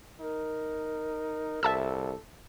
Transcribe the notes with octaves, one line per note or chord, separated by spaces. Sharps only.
D#4 A#4
C2 A4 E5 A5 E6